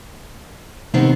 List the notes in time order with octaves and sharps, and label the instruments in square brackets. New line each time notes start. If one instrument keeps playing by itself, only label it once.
[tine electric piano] C3 D#4 [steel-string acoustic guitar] D#3 B3 C4